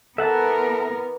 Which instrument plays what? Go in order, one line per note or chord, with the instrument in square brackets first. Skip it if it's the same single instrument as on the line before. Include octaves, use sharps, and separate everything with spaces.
[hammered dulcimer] E3 [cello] B3 A#4 [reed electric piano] A4 [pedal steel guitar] E5 F#5 A5